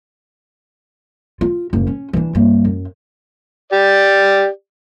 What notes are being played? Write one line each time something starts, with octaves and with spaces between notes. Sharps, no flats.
F4
F#1 A2
C#4
E3 D4
G2 A#3
F#2
G4 D5